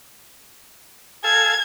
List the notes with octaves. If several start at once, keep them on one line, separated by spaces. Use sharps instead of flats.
A4 F5 G#5 A5 G#6